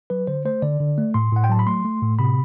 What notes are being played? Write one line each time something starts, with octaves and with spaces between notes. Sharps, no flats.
F#3 B4
D3 C5
A3 C5
D3 D5
D3
A3
A2 C6
A2 F#5
G5
F#3 A5
B5
A3 C6
A3
A2
C3 B5